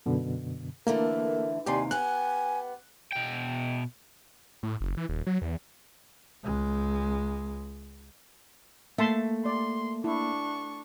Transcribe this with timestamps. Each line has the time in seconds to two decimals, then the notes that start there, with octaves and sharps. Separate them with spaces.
0.06 F#2 B2 D3
0.87 D3 E3 A3 A#3 A#4
1.66 D#2 C3 G4 D5 G#5 C6
1.91 B3 G4 G#5 F#6
3.13 B2 G5
4.63 A2
4.81 F#1
4.97 E3
5.09 D#1
5.27 F#3
5.42 E2
6.44 C#2 G#3
8.98 A3 A#3 E5 A5 C6
9.46 D5 C6
10.04 D4 E4 C#6